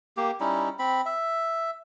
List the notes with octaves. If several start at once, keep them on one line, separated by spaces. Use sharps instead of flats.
A#3 G4
G3 C#4 D#4 E4
C4 B5
E5